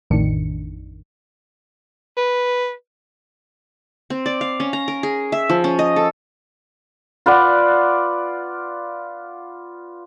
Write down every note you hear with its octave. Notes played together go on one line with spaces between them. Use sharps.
A1 F2 A2 D#3 D4 C#7
B4
C4
D5
F5
C#4
A#5
A#4
G#4
E5
F3
C#4
D#5
A4
F4 B4 D5 F#5